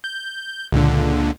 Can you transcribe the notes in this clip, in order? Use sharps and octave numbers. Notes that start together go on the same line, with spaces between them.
G6
C#2 A#2 D3